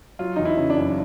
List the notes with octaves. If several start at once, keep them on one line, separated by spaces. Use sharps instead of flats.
F#3 F4
E2 D#4
E4
C#3
D4
F#1